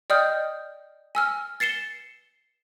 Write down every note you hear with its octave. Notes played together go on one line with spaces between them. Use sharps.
D5 D#5 G5 D#6 F6 G6
G#5 E6 F6
A6 C7 C#7 E7 G7